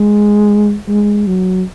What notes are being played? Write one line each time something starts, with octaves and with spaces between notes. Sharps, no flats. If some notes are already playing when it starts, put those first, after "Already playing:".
Already playing: G#3
G#3
F#3